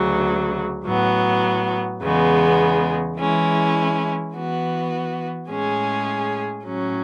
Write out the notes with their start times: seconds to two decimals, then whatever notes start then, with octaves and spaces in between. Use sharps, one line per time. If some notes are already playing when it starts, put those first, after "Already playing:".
Already playing: D2 C#3 F#3
0.84 A2 F#3 B3
2.00 E2 C#3 G#3 B3
3.16 E3 G#3 C#4 E4
4.33 E3 B3 F#4
5.49 A2 G#3 C#4 G#4
6.64 A2 F#3 C#4